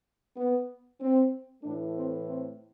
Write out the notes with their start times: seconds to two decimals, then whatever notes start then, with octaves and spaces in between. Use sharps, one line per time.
0.37 B3
1.00 C4
1.63 A2 E3 A3 D4
1.95 C4
2.27 C4